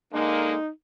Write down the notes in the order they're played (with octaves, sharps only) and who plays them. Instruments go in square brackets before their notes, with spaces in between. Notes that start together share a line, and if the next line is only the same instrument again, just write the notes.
[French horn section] D3 G#3 A#3 [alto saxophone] D#4